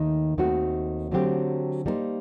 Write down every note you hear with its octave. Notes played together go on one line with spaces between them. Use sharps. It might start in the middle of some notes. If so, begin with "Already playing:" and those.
Already playing: D#2 D#3 A3 D#4
D#2 D#3 A3 C4 F#4
D3 F#3 A3 C4 G4
G3 A#3 D#4 A4 C5